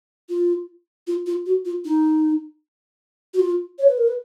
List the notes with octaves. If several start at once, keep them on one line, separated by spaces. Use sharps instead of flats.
F4
F4
F4
F#4
F4
D#4
F#4
F4
C#5
B4
A#4
B4